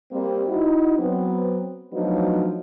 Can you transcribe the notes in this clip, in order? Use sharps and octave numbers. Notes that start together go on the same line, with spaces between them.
G3 A#3 C4
D#4 E4 F#4
F#3 B3 C4
F3 F#3 A3 B3 D4 D#4